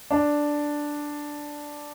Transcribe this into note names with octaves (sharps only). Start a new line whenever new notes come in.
D4